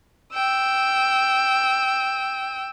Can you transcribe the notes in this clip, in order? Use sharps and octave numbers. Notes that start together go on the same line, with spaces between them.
G5 E6